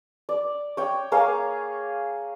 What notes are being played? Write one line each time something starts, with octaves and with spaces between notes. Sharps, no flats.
D5
C#5 G5
A#3 G#4 C#5 F5